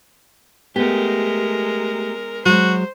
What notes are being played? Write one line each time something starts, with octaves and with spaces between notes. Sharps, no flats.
G#3 A3 B3 G4 A#4
F#3 G#3 F#4 C5